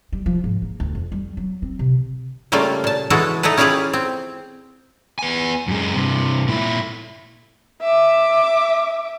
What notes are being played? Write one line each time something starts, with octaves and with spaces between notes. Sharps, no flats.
G3
F3
G#2
A#3
D2
F2
G3
F#3
C4
C3
C#3 G3 A3 A#3 F4
A#2 A5
E3 G#3 E4 F#4 A4
E3 D#4 E4 A4 B4
C#4 E4 F4 G4 G#4 D5
C4
B3 G#5
F#2 G#3
G2 C3
A#2 E4
E5 D6